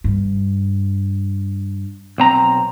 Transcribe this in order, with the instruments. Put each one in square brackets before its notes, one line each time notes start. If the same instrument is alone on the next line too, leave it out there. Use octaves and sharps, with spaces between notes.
[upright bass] G2
[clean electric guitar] B1 C4 A#5